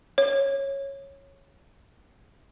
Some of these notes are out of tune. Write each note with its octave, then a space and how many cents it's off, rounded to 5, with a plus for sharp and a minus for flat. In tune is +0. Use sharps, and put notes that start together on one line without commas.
C#5 -10